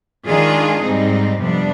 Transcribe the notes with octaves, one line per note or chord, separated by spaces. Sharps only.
D#3 G#3 D4 F4 G#4
G#2 G3 C4 D#4
F2 C3 G3 B3 D4